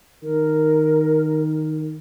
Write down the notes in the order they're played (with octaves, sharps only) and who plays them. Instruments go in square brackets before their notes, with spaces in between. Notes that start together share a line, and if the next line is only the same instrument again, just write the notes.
[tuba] D#3 [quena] A#4